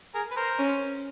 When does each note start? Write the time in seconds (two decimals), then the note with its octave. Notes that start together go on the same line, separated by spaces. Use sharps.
0.15 G#4 A#4
0.31 B4
0.37 A#4 C5
0.59 C#4